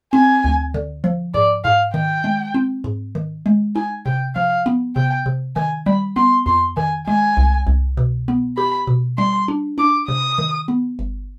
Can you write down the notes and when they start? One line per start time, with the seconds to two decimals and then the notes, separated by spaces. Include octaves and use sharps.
0.13 C4 G#5
0.44 D2
0.74 D3
1.04 F3
1.34 G#2 D5
1.64 G#2 F5
1.94 D#3 G5
2.24 G#3
2.54 C4
2.84 G#2
3.15 D#3
3.46 G#3
3.76 D#4 G#5
4.06 C3 G5
4.35 F3 F5
4.66 B3
4.96 C3 G5
5.26 C3
5.56 D#3 G#5
5.86 G3 B5
6.16 B3 C6
6.46 F2 C6
6.77 D#3 G#5
7.08 G#3 G#5
7.37 C2
7.67 C2
7.97 B2
8.28 B3
8.57 G4 B5
8.87 B2
9.18 G3 C6
9.48 D4
9.78 D4 D6
10.08 C3 D#6
10.38 D#3
10.68 B3
10.99 G1